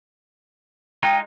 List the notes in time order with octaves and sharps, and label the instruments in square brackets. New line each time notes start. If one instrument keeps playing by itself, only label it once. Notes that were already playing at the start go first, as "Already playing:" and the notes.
[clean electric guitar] G#3 D#4 F4 [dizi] G5